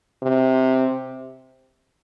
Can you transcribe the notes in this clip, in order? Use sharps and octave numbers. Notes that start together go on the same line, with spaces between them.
C3